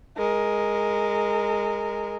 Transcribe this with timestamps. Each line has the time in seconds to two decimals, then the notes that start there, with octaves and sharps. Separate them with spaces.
0.17 G#3 A#4